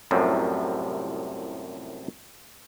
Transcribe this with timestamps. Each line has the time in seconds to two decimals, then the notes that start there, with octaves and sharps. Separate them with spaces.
0.11 C2 F#2 A2 C3 F3